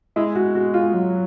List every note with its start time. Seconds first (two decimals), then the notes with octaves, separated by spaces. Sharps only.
0.16 G#3 E4
0.35 F#4
0.55 F#4
0.74 F4
0.94 F#3